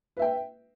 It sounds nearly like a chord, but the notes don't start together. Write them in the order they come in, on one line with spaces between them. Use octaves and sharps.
B4 E5 G5